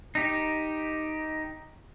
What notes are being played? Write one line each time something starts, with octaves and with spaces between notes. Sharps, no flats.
D#4 G4